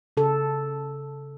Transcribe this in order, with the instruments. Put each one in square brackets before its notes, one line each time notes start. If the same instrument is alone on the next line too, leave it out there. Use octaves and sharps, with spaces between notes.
[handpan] C#3 A4